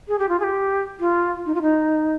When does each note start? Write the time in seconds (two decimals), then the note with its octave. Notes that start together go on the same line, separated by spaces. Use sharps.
0.08 G#4
0.19 G4
0.29 F4
0.40 G#4
0.43 G4
1.00 F4
1.46 D#4
1.55 F4
1.62 D#4